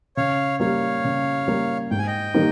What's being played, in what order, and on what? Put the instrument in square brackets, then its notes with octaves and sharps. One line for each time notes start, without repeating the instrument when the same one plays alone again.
[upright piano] C#3 [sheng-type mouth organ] C#5 F5
[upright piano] G3 A#3 [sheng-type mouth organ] C#5 F5
[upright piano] C#3
G3 A#3
[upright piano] G#2 [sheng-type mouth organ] G5
[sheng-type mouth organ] G#5
D#5 G5
[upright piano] D#3 G3 A#3 D#4